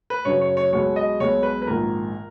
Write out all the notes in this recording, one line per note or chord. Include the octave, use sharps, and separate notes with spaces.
B4
F#2 C#3 F#3 C#5
C#5
C#5
B1 B2 G#3 B3 C#5
D#5
B1 B2 G#3 B3 C#5
B4
B4
A#1 G#2 D#3 A#4